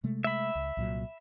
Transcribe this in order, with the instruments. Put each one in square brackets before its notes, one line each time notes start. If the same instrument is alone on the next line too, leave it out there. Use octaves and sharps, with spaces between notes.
[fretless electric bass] C3 G#3 A3
[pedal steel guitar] E5 B5
[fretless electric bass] C#2
C2 A#2 F#3